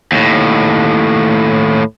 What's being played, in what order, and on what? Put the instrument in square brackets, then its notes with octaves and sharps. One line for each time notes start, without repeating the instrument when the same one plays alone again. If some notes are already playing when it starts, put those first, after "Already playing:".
[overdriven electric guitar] D#2 A2